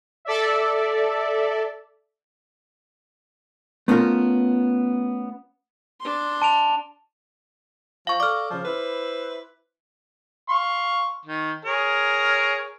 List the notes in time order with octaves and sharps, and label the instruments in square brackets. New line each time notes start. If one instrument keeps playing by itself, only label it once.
[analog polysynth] A4 D5 E5
[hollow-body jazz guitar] A3 B3 C#4 F4 A#4
[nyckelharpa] D4 C6
[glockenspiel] A5 D7 F7
[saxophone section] F3 [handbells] F5 C#6
[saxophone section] A4 D5 [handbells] D6 F6
[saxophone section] C#3 F3
E4 B4 C5
[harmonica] F5 C6 C#6
D#3
G#4 A#4 C#5